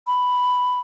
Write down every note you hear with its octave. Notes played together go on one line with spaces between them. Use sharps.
B5